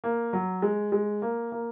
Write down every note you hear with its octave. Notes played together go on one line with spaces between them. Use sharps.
A#3
F#3
G#3
G#3
A#3
A#3